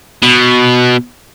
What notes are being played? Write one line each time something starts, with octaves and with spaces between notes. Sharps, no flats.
B2